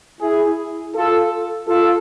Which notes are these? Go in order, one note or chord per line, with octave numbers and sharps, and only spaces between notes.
E4 G#4
F4 A4
F4 A4